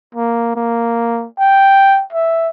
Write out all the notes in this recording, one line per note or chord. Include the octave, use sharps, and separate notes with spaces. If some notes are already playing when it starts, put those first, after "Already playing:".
A#3
A#3
G5
E5